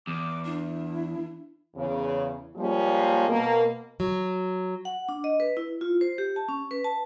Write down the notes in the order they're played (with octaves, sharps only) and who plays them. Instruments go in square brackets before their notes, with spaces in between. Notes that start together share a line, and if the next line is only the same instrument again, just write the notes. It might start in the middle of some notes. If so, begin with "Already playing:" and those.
[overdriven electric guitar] E2 [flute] D6
[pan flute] D4 [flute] E4
[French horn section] E2 C#3
F3 G3 G#3 A#3 C#4
B2 A#3
[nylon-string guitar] F#3
[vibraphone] F#5
D4
D#5
B4
E4
F4
C5
G4
A5
C#4
B4
A5